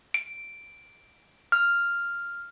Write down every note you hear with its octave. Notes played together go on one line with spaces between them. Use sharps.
D7
F6